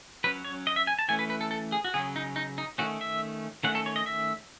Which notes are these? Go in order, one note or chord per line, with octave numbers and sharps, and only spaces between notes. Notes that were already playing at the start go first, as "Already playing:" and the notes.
F#3 C#4 B4
C#5
D#5
E5
G#5
A5
E3 A3 C#4 G#5
B4
B4
A4
A4
G#4
F#4
C#3 F#3 C#4 G#4
D#4
D#4
D#4
D#3 A3 C#4 F#4
E5
D#3 A3 C#4 F#5
A4
C#5
D#5
E5